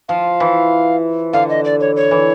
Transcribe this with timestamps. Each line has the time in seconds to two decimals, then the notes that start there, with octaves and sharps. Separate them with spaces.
0.09 F3 F5
0.40 E3
1.33 D3 F5
1.50 D#5
1.65 D5
1.81 C#5
1.96 C#5
2.11 E3